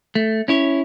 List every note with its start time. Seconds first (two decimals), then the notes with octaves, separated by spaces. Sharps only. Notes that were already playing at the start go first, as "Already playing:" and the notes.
0.15 A3
0.48 C#4 E4 C#5